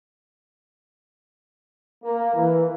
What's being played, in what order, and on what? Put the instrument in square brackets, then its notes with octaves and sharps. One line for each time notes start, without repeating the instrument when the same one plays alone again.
[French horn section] A#3
E3